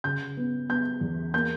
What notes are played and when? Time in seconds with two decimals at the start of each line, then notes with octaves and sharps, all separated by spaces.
0.04 C#3 G6
0.37 B3
0.69 B3 G6
1.01 E2
1.34 A#3 G6